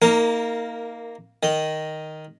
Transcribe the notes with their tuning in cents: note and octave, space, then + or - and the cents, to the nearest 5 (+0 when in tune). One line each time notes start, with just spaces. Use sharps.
A#3 +0 D#4 +30 A#4 -15
D#3 +0 D#5 +0